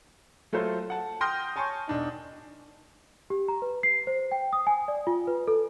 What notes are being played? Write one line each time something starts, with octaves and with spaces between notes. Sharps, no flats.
F#3 A3 F4 A4 C5
F#5 A5
G5 C6 D#6 F6 G6 A#6
C#5 G#5 A5 C6 C#6
E1 D4 D#4
G4
A#5
B4
C7
C5
G5
D#6
G#5
D5
F4
B4
A4